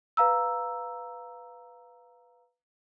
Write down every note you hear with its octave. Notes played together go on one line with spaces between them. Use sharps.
B4 F5 A#5 E6